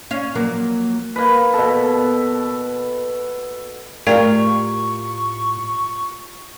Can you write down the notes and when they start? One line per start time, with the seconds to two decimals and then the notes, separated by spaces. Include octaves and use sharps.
0.11 C#4 F5
0.35 F3 F#3 A#3
1.16 A#3 B4
1.54 B2 A4
4.07 A2 A3 F4 G4 A#4 D5 F5 C#6